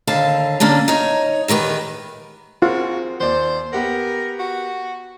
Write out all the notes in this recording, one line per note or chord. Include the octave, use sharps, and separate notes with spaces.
D#2 D3 F5 A5
D3 A#3 C#4 D4
D#4 C#5
E2 D#3 G4 G#4 B4
C4 F4 F#4 G#4 A#4
D#2 C5 D5
B3 G4 A#4 F#5
F#4